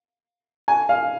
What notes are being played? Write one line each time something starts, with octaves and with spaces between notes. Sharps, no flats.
G#5
F5